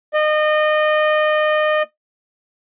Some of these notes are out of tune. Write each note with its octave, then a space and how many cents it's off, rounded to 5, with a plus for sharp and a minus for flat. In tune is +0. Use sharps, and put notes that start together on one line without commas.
D#5 -30